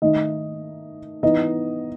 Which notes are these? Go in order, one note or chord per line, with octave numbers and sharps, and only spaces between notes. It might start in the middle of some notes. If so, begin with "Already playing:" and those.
D#3 A3 D#4 D#5
E3 B3 D#4 D#5